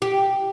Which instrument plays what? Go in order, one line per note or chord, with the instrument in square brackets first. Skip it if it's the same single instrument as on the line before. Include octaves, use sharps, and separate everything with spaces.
[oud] G4